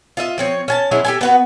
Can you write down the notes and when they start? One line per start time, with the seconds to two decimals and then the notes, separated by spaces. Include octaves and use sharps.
0.17 F4 D#5 E5
0.38 F3 C4 C#5
0.68 C#4 G#5 A5
0.91 F#3 G#3 C#4 E4
1.04 G4 A4 G#5
1.21 B3 F#4 B4